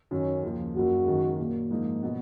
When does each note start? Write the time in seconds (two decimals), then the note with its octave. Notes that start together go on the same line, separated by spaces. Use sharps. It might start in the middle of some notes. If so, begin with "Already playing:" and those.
0.11 F#2 D#3 F#3 C#4
0.43 D#2 C#3 F3
0.75 F#1 F#2 C#3 F#3 A#3 F#4
1.07 F#1 F#2 D#3 G#3
1.39 A#2 F#3 A#3
1.71 G#2 F3 A#3 D#4
2.03 B2 F#3 B3 F#4